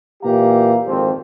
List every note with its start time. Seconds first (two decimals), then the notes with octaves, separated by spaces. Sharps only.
0.23 A#2 E3 G4 F5 A#5
0.86 G#1 F2 C4